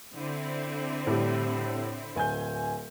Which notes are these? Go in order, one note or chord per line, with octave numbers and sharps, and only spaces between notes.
D3 C4 E4
A2 G3
D1 G#5 G6